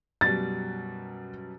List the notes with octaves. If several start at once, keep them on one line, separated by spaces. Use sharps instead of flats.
F#2 B2 G3 A6